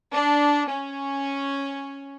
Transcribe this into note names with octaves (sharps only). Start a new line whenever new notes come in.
D4
C#4